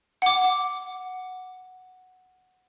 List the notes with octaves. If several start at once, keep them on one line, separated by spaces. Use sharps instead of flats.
F#5 D6